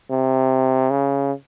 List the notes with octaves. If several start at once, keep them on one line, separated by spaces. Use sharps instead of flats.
C3
C#3